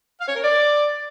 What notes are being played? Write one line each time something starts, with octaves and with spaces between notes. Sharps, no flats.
F5
C#5
A#4
D5